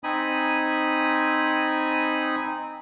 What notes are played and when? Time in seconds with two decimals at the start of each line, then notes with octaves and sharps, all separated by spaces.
0.04 C4 D#4 G#5 B5 D#6